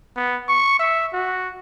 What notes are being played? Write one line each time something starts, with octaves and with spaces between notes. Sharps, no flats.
B3
C#6
E5
F#4